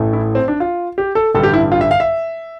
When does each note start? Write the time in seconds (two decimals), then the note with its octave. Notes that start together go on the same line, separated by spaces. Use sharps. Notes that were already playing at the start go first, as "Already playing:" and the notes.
Already playing: A1 A2 E3 A3
0.13 E4
0.35 C4
0.48 D4
0.60 F4
0.98 G4
1.15 A4
1.35 A1 G2 D3 G3 A4
1.43 G4
1.54 E4
1.72 F4
1.81 E5
1.91 F5
2.00 E5